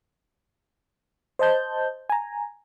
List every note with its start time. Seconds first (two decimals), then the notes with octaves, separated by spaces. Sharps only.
1.39 C5 D#5 A5 G6
2.10 G#5 A#5